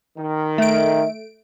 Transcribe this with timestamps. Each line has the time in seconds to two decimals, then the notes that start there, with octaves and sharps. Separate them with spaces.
0.17 D#3
0.58 A3 E5 D7